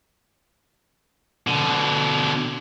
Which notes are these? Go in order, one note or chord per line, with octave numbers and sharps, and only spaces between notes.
B2 D3